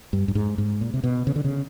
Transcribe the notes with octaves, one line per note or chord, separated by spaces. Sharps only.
G2
G2
G#2
G#2
A#2
C3
B2
C#3
D3
C#3